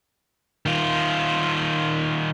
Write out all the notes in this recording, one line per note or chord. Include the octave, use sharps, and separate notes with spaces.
D#3 F4